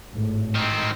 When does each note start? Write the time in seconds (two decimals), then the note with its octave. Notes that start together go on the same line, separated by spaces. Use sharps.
0.14 G#1 A2
0.55 D#3 C4